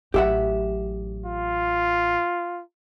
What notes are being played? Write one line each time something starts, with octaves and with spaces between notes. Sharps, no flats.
A1 F#3 G4 E5 F#5
F4